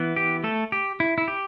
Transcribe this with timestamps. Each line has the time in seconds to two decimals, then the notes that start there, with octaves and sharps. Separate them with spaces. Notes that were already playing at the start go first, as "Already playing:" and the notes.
Already playing: E3 B3
0.16 G4
0.44 A3 A4
0.72 G4
1.00 E4
1.18 E4
1.28 G4